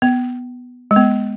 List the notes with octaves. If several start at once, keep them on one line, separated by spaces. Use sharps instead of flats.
B3
G#3
B3